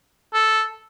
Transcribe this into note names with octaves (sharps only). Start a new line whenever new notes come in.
A4